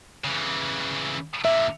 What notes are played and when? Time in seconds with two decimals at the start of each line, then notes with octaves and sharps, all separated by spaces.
0.24 C#3 E3
1.45 A#2 D3 E5